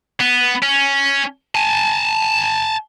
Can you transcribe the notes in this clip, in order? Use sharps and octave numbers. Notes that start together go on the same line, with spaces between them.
B3
C#4
G#5 A5